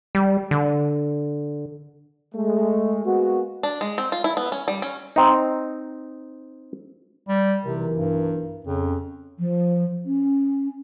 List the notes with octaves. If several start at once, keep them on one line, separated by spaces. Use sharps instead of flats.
G3
D3
G#3 A3
G#3 A#3 B3 F#4
D4
G#3
C4
F4
E4
B3
C#4
G3
C#4
C4 D#4
G3
B1 C3 E3 A#4
G2
F2 C#3
F3
C#4